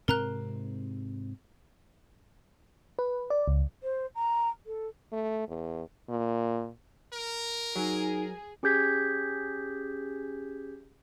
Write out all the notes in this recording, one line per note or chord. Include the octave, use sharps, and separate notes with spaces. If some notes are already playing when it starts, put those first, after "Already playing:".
G#2 C3 C4 A#4 A#5 F#6
B4
D5
C#2
C5
A#5
A4
A3
E2
A#2
A#4
F#3 D#4 G#4
C#4 G4 G#4 G6 G#6 B6